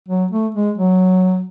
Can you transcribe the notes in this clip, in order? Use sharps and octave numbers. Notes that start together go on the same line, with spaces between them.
F#3
A3
G#3
F#3